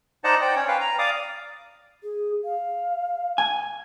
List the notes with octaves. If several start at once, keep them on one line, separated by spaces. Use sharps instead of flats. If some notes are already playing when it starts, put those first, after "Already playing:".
D#4 C5 D5 D#5 F#5 A5
C5 D5 F#5 G5
C#4 C#5
B4 F5 G5
A#5
D5 F5 D6 D#6
G#4
F5
G#5